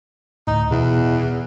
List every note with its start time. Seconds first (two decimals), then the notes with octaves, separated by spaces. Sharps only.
0.47 D2 A2 D#4
0.71 E2 B2